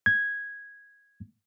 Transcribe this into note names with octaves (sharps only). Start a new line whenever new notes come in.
G#6